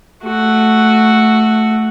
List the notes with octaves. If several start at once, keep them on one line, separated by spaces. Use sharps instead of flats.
A3 F#4